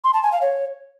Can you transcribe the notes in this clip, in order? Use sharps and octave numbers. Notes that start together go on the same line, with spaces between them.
C6
A5
G#5
F5
C#5